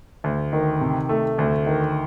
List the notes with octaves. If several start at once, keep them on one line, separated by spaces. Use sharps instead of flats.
D2
D#3
C3
A3
D2
D#3